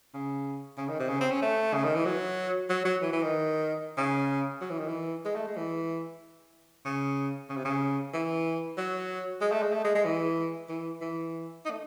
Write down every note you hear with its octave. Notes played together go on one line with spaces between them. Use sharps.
C#3
C#3
D#3
C3
C#3
C4
C#4
A3
C#3
D#3
E3
F#3
F#3
F#3
E3
E3
D#3
C#3
F#3
E3
D#3
E3
G#3
A3
G#3
E3
C#3
C#3
C3
C#3
E3
F#3
G#3
A3
G#3
A3
G#3
G#3
E3
E3
E3
D#4
A3